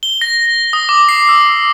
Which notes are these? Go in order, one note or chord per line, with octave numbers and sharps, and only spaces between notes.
G7
A#6
D#6
D6
C7
E6